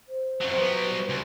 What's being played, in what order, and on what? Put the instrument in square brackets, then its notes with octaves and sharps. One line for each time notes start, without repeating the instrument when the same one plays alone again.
[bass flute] C5
[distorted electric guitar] F2 F#3 [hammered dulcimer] F3 E4 F4
[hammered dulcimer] G2 C6 [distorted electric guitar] F#3 B3 [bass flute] B4
[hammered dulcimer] G3
[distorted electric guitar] C#2 [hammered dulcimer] G#4 A#4 B4